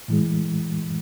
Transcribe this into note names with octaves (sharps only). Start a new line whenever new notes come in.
A2 E3 G#3